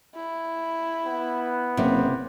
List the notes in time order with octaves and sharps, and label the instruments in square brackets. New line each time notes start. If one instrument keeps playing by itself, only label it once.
[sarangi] E4
[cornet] B3
[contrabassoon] F#1 [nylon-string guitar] C3